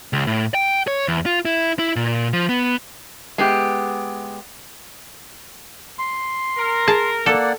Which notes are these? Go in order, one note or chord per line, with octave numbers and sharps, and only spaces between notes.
C#2
A2
G5
C#5
E2
F4
E4
E4
A#2
F3
B3
G#3 B3 G4
C6
A#4
G#4 A5
A#3 A4 D5 F#5